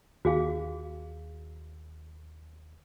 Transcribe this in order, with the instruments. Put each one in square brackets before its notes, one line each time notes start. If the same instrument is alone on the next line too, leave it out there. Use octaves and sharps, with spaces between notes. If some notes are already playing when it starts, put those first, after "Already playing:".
[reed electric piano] D#2 [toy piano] F#4 G#4 F5